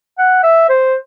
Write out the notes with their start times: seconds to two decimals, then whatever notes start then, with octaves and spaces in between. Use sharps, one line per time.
0.18 F#5
0.43 E5
0.69 C5